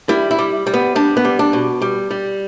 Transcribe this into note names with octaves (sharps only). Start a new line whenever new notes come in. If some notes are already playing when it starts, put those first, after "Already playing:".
G3 E4
E4
G3
G3
B3
G3 D4
B3
G3
D4
B2
G3
G3